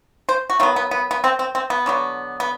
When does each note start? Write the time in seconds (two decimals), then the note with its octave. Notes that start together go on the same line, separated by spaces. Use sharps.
0.29 C5
0.50 F#4
0.59 D#3 F#3 B3 F4
0.76 B3
0.91 B3
1.11 B3
1.24 C4
1.39 C4
1.55 C4
1.70 B3
1.86 D3 F#3 B3
2.40 B3